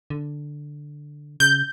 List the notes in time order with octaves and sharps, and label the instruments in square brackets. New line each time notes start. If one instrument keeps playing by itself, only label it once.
[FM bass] D3
[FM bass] C#3 [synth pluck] G6